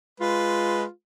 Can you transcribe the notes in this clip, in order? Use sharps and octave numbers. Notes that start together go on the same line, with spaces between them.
G#3 F4 B4